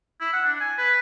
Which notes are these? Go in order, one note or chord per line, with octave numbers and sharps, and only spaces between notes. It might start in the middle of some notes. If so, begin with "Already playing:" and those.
E4
F#5
D4
G#5
B4